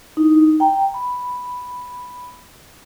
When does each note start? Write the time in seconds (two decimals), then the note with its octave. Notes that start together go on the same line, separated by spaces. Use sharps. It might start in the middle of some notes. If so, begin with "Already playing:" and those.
0.17 D#4 E4
0.60 G5 A#5
0.94 B5